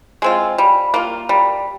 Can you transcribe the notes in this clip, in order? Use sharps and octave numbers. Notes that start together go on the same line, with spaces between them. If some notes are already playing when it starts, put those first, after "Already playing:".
G#3 C4 F4
G3
A#3 F4
G3